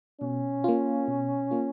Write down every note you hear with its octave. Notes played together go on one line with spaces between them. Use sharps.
B2 C#4
A#3 F4
B2
A#3 F4